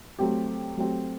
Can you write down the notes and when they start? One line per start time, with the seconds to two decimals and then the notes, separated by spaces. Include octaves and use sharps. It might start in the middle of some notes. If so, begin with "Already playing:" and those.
0.19 F#3 A3 C4 G4
0.77 F#3 A3 C4 G4